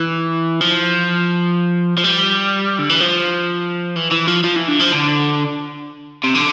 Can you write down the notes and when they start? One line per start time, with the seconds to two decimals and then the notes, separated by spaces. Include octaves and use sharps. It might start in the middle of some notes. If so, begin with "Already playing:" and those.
Already playing: E3
0.61 F3
1.98 F3
2.04 G3
2.79 D3
2.89 E3
3.00 F3
3.96 E3
4.12 E3
4.28 F3
4.44 F3
4.56 E3
4.68 D3
4.79 F3
4.92 D3
6.24 C3
6.35 D3